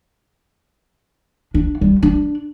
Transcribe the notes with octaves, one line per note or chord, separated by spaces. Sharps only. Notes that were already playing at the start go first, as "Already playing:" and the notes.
D4
G3
D4